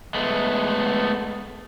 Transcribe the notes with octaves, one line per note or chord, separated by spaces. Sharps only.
G#3 A3 B3